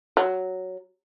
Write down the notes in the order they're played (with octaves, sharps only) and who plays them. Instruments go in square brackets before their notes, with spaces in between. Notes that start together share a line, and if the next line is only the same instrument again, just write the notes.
[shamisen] F#3